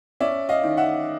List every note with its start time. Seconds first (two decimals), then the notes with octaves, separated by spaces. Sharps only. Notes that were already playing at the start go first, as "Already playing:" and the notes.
0.20 C#4 D5 E5
0.49 D#5 F5
0.64 D#3
0.77 E5 F#5